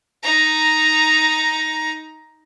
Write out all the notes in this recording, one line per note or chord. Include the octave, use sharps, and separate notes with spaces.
D#4 A#5